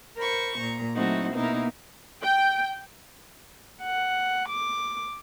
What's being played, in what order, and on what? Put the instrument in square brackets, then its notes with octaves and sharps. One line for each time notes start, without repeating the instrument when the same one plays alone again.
[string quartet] A#4 C5 B5 C#6
A#2 A#5
F#3 A3 C4 D#4 E4 F#4
B2 A#3 D#4 E4 A#4
[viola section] G5
[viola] F#5
D6